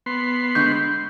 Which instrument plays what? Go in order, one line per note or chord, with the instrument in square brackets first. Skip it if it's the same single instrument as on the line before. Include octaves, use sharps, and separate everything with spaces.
[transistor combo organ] B3 C6
[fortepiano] D3 G#3 C#6 [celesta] G6